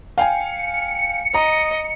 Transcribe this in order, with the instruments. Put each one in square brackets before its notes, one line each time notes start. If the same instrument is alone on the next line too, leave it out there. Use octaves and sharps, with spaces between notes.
[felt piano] F5 G5 G#5 [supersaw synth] C#7
[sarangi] D#5 [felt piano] A#5